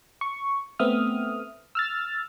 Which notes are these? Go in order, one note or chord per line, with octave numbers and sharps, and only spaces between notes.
C#6
A3 B3 C4 E5 D#6 F6
E6 F6 A6